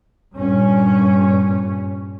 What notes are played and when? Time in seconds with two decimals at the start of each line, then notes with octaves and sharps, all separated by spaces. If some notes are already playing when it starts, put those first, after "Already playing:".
0.36 G2 A#2 C#4